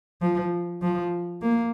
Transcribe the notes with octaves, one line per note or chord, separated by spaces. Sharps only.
F3
F3
A#3